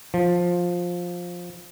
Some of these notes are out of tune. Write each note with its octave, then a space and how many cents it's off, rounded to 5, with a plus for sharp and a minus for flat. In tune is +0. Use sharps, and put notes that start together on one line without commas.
F3 +10